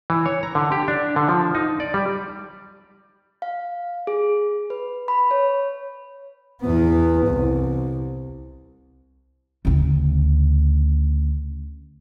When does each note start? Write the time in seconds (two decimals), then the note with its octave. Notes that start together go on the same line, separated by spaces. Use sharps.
0.10 E3
0.26 C#5
0.43 A#5
0.55 D3
0.72 G4
0.88 D4
1.16 D3
1.28 F3
1.55 D#4
1.80 D5
1.94 G3
3.42 F5
4.07 G#4
4.70 B4
5.08 B5
5.31 C#5
6.62 E2 B3
7.27 C2
9.65 D2 C#3